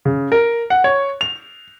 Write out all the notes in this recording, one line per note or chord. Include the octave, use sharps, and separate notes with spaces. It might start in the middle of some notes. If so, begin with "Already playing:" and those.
C#3
A#4
F#5
C#5
F7